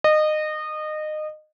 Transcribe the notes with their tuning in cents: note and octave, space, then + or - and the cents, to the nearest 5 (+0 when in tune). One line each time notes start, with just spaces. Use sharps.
D#5 -25